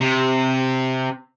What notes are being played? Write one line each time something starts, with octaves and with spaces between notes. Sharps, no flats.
C3